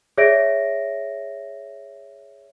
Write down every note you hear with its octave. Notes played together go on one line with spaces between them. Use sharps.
G#4 C#5 D5 E5 A#6 D7